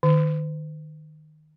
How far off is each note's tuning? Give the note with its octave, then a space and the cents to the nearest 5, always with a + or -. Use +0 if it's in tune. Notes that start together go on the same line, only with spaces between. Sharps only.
D#3 -20